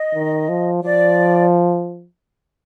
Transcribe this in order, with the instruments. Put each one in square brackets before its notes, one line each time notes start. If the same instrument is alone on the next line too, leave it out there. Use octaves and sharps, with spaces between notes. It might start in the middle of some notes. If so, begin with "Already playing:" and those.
Already playing: [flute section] D#5
[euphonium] D#3
F3
[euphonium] F3 [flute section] D5